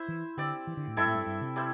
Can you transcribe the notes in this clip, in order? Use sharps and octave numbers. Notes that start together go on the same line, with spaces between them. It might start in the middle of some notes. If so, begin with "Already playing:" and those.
Already playing: E4 C5 E5
E3
D3 C4 G4 D5
E3
D3
A2
G2 C4 E4 A4 E5
A2
G2
G2
C3
G3 E4 C5